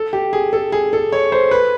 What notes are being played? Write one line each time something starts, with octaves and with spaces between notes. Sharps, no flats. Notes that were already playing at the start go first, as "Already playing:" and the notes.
Already playing: A4
G4
G#4
A4
G#4
A4
C#5
C5
B4